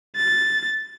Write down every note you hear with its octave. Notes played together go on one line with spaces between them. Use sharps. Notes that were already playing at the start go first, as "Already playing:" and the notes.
A6